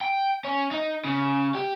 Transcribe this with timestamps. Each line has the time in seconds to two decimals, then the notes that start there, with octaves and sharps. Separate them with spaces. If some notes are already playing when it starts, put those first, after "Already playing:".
0.01 G5
0.44 C#4
0.71 D#4
1.05 C#3
1.55 G4